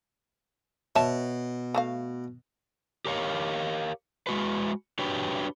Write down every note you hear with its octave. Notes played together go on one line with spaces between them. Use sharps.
B2 C#5 E5 A5
A3 F#4 F5
G4 A#4 C#5 F5
G#3 F#4 B4
D4 F#4 G4 B4 C#5